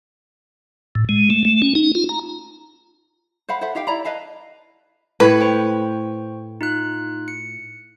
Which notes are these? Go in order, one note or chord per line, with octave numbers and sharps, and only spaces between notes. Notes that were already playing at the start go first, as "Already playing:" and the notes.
A2
G#3
A3
A3
C#4
D#4
F4
A#5
C5 F5 F#5 B5
A4 C5 E5 F#5
D#4 G4 F5 G5
E4 D5 A#5 B5
B4 D#5 F5 A5
A2 B4 C#5
C5 G5 C#6
D#4 F4 F#6
C#7